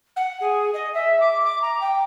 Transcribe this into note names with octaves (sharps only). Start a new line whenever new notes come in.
F#5
G#4
D#5
E5
D6
D6
A#5
G5